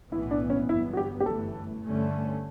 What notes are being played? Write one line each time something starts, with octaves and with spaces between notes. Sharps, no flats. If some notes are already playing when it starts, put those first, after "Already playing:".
B1 A2 E3 B3 E4
D4
C#4
G1 G2 F#3 B3 E4
F#4
G4
G4
G1 F#2 E3 A3 A4
G2 D3 A3 C#4